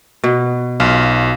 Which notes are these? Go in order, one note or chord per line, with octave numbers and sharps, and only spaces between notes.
B2
B1 F4